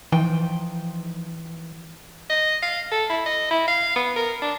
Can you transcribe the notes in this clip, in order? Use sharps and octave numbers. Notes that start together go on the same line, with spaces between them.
E3 F3 D#4 G5
D#5
F5
A4
E4
D#5
E4
F5
B3
A#4
D4